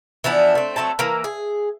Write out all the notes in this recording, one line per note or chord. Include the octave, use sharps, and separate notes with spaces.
E3 F3 B3 D4
A3 C4
F#3 A3 C4 A5
E3 A#3
G#4